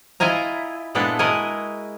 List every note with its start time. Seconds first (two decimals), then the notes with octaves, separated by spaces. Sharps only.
0.20 E4 F4 D#5 G#5 A#5
0.95 A#2 G#3 B3 D4 E4 A4
1.19 G#3 E4 F#4 A#4 D#5 G#5